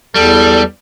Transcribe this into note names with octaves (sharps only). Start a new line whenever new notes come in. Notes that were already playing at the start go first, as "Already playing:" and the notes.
E2 G3 A4